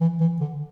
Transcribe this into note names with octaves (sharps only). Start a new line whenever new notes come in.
E3
E3
D3